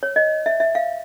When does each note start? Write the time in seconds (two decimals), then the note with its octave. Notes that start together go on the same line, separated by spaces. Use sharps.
0.03 C#5
0.16 D#5
0.46 E5
0.60 E5
0.75 F5